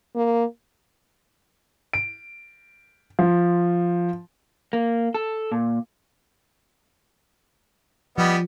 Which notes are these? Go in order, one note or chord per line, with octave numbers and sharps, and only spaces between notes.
A#3
D7
F3
A#3
A4
A#2
F3 G3 B3 D#5